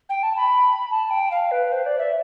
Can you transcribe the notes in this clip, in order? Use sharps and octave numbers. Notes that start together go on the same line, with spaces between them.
G5
A5
B5
A5
G5
F5
B4
C5
D5
E5